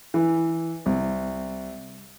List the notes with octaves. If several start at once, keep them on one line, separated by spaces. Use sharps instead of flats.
E3
C2